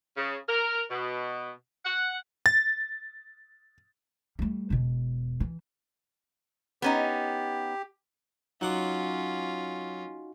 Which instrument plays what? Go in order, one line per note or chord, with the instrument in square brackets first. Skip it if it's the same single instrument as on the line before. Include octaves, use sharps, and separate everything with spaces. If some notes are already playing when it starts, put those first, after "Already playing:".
[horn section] C#3
A#4
B2
F#5
[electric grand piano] A6
[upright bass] G3 A3
E1 B2
E3
[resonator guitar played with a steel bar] B3 C#4 D#4 [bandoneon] G4
[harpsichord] F#3 F#5 D6 [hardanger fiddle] C#4 F4 [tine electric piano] D#4 F#4